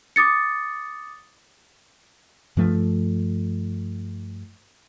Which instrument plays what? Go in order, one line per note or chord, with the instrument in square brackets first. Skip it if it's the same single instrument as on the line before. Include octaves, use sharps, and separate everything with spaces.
[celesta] D6 D#6 A6 C#7
[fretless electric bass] G2 F3 A3